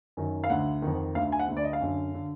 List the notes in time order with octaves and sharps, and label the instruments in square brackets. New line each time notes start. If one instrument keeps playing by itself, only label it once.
[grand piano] F#2 D#3
F5
D2 D3 F#5
F2 D#3
D2 D3 F5
G#5
F#5
D2 D3
D5
D#5
F5
F#2 D3
D3